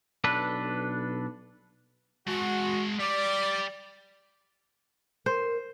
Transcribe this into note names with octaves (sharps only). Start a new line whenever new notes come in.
B1 D4 A4 B4
G#3 F#4 A5
G3 D5
A#4 C5